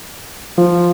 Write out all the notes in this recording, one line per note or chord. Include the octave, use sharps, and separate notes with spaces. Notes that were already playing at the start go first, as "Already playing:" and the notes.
F3